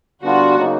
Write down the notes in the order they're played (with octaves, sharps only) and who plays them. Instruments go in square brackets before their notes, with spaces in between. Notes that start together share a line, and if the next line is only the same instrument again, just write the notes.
[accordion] D3 G3 B3 D4 F4 [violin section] F#4
[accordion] C#3 F#3 A#3 D#4